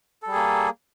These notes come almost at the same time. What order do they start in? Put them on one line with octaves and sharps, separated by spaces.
A4 G3 G#4 A#3